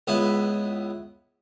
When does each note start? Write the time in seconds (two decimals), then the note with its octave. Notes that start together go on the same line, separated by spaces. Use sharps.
0.07 C#2 B3 E4